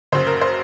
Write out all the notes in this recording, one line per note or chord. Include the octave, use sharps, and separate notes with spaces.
F#1 F#2 C#3 C5
A#4
C5